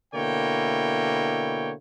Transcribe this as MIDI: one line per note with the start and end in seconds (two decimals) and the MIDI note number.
0.15 1.72 47
0.15 1.72 50
0.15 1.72 58
0.15 1.72 64
0.15 1.72 73
0.15 1.72 79